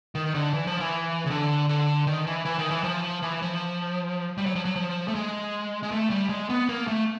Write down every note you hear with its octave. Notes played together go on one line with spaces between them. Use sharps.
D#3
D3
E3
F3
E3
C#3
D3
D3
D#3
E3
E3
D#3
E3
F3
E3
F3
G3
F#3
F3
F#3
F3
A3
G#3
G#3
A3
G3
G#3
B3
A#3
A3